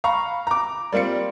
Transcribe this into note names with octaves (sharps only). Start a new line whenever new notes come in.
F5 A#5 B5 C#6
A#5 D6
G3 A#3 C4 F4 C#7